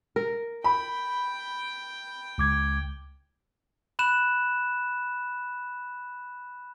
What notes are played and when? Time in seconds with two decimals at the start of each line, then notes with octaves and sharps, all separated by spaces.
0.16 A#4
0.64 G5 B5
2.38 C#2 D6 G#6
3.99 B5 F#6 E7